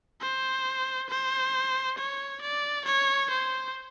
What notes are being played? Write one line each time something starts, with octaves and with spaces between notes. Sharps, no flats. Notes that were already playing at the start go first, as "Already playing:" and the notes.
C5
C5
C#5
D5
C#5
C5